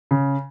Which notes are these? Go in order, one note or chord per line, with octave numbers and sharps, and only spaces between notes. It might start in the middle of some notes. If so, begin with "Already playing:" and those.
C#3